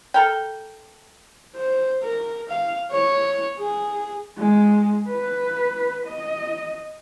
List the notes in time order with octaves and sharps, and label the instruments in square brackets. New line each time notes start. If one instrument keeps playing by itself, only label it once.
[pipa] A4 A#4 G5
[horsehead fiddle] C5
A#4
F5
C#5
G#4
G#3
B4
D#5